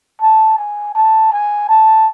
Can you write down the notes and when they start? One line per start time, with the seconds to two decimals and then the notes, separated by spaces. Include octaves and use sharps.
0.22 A5
0.58 G#5
0.95 A5
1.32 G#5
1.69 A5